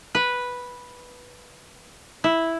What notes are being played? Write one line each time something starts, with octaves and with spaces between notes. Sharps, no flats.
B4
E4